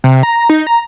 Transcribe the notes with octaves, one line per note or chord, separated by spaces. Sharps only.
C3
A#5
D#4
A#5